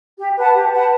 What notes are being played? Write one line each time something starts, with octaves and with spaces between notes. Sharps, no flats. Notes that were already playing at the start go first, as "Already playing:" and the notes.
G4
B4 F#5 A5
G4
B4 F#5 A5